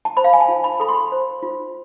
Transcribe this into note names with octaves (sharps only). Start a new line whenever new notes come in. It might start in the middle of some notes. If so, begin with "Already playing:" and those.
A5
C5 B5
F5
G#5
A5
F4
B5
A4 B5
C6
C5
F4